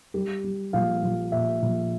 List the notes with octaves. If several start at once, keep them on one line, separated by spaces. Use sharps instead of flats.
G3 G4
G3
A#1 F5
A#1
A#2 E5
A#1